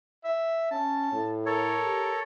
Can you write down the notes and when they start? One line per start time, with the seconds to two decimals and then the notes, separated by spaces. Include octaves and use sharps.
0.24 E5
0.71 C#4 A5
1.13 A2
1.46 A4 A#4 C#5
1.85 G4